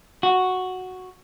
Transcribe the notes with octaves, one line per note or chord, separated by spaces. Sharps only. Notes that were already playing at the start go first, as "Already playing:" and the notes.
F#4